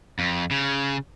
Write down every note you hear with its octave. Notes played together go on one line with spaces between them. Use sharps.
F2
C#3